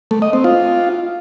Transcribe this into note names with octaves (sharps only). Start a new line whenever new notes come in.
A3
D#5
C4
F4